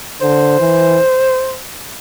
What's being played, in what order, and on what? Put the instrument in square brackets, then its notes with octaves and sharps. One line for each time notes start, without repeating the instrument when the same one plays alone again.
[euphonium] D3 [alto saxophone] C5
[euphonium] E3